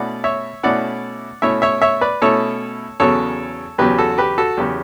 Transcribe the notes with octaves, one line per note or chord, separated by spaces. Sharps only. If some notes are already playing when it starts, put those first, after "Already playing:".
Already playing: B2 A3 C#4 E4 D5 F#5
C#5 E5
B2 A3 C#4 E4 D5 F#5
B2 A3 C#4 E4 C#5 E5
C#5 E5
C#5 E5
B4 D5
B2 A3 C#4 E4 A4 C#5
E2 C#3 F#3 B3 A4 C#5
E2 C#3 F#3 B3 G4 B4
F#4 A4
G4 B4
F#4 A4
E2 C#3 F#3 B3 G4